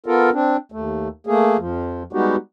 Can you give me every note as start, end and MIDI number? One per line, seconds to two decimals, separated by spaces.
0.06 0.30 59
0.06 0.30 65
0.06 0.30 69
0.06 0.30 70
0.33 0.57 60
0.33 0.57 62
0.72 1.08 39
0.72 1.08 57
1.27 1.57 57
1.27 1.57 58
1.27 1.57 68
1.59 2.03 41
1.59 2.03 53
2.13 2.36 55
2.13 2.36 56
2.13 2.36 59
2.13 2.36 63
2.13 2.36 66
2.13 2.36 67